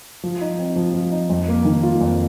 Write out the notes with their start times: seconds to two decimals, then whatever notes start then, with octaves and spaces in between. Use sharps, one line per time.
0.23 F3
0.41 D#4
0.59 C4
0.76 F3
0.94 F3
1.12 D#4
1.30 F2
1.48 A#3
1.65 D#3
1.83 F4
2.01 F2